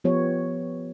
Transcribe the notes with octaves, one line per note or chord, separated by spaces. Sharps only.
F3 B3 G4 C#5